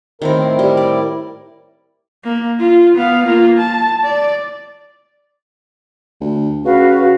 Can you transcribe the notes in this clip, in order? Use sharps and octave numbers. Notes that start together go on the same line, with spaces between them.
A2 D#3 C4 E4 A#4 C5
G3
D5
A#3
F4
B3 F5
A#3 F4
A5
D5
D2
C#3 F#4 B4 F5
F#4